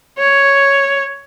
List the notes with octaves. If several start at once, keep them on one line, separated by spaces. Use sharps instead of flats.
C#5